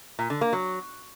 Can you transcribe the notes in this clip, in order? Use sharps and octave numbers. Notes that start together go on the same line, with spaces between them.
A#2
D3
A#3
F#3